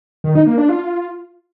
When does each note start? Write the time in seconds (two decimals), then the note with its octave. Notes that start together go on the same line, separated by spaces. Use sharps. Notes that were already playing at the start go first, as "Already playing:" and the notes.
0.24 D#3
0.35 D#4
0.47 A#3
0.58 D4
0.69 F4